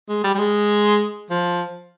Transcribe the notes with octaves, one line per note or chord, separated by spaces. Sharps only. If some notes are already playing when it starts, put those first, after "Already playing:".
G#3
G3
G3
G#3
F3